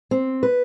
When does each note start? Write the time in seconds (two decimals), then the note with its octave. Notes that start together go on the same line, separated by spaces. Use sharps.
0.11 C4
0.43 B4